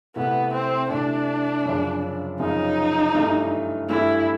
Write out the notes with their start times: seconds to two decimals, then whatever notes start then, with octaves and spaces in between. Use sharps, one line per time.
0.16 C3 E3 A3 B3
0.54 C4
0.90 C3 E3 A3 D4
1.65 F#2 C#3 F3
2.40 F#2 C#3 F3 D#4
3.14 G2 E3 A3
3.89 G2 E3 A3 E4